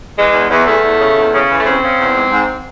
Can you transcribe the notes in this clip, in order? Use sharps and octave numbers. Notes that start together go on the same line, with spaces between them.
E3 G#3
E2
E2
E2 A3
E2
C#3
E2
C#3
E3
A3
C#3 C4
C#3
E2
G#2
G#2